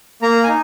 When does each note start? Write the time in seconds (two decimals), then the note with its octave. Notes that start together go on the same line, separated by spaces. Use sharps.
0.22 A#3 A#5
0.44 G#5
0.48 D#4